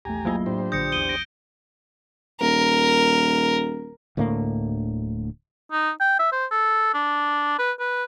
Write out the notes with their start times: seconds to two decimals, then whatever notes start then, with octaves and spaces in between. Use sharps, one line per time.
0.05 A#1 E2 A3 G4 G#5 A#5
0.25 F#3 A#3 F4
0.46 A2 D4 G4 C5
0.72 A#1 D3 D#6 G6 A#6 C#7
0.92 A#1 E2 D7 D#7 G7
1.09 A#6 D7
2.41 D#1 A#4
4.17 D1 D2 A2 A#3
5.72 D#4
6.00 G5
6.19 E5
6.32 C5
6.51 A4
6.94 D4
7.59 B4
7.79 B4